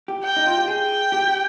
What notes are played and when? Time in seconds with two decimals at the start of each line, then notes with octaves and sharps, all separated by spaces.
0.08 G4
0.24 G5
0.36 D#4
0.47 F4
0.57 G4
0.67 G#4 G5
1.12 G4
1.28 G4